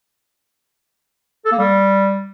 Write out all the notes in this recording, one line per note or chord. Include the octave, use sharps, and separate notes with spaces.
A4
A#3
G3